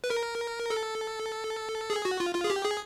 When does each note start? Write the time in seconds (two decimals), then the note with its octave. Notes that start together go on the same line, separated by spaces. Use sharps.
0.04 B4
0.10 A#4
0.70 A4
1.90 G#4
2.05 F#4
2.20 F4
2.35 F4
2.44 G#4
2.50 G4
2.65 G#4